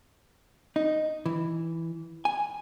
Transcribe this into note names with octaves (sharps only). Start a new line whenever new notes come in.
D#4
E3
G#5